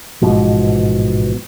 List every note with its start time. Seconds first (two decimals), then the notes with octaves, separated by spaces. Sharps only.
0.22 A1 G#2 B2 F3